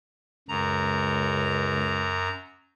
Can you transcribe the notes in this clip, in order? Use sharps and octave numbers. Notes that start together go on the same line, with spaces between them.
C#2 F#2 A#5